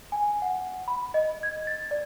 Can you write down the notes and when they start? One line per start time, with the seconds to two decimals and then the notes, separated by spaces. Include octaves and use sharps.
0.12 G#5
0.42 F#5
0.88 B5
1.14 D#5
1.43 G#6
1.67 A6
1.91 D5